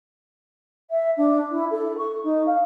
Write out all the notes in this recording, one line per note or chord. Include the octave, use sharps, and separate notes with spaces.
E5
D4
E4
A4
C#6
D#4
F5